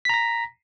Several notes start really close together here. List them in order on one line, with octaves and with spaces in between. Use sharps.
B6 A#5 A#6